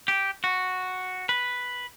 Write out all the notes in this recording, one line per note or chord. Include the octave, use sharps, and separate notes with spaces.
G4
F#4
B4